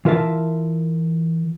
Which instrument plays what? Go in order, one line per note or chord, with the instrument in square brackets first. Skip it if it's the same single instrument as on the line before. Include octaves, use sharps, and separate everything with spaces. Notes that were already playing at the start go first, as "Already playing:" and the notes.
[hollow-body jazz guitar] E3 F4 A#4 E5 A5